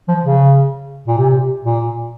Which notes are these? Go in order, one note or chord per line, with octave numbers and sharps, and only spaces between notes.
F3
C#3
A#2
C3
A#2